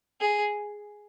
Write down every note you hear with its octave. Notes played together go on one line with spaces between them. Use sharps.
G#4